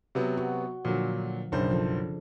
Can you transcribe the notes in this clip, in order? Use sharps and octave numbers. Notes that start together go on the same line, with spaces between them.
C3 F#3 B3
F#4
A#2 D3 F3 F#3
F#1 B1 C#3 D4 C5
C#3 F3 A4